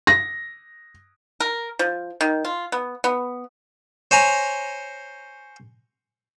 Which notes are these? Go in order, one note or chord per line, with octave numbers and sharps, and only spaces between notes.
A#6
A#4
F3
D#3
F4
B3
B3
C5 C#5 G#5 A#5